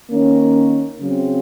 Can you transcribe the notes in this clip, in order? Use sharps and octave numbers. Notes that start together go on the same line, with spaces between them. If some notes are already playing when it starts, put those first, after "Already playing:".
D#3 A#3 C#4
C#3 F#3 C4